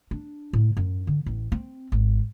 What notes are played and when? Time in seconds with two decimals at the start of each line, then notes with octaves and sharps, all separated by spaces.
0.11 D4
0.53 A2
0.77 F#2
1.07 D3
1.26 A1
1.52 C4
1.92 G#1